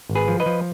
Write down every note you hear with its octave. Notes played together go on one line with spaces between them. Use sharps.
G#1
G#4 B4
F3
B4 D#5
F3